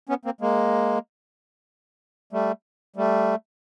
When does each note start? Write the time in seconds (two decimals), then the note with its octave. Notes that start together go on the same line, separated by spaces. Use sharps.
0.09 B3 C#4
0.25 A#3 C4
0.41 G#3 A#3
2.33 G3 A3
2.96 G3 A3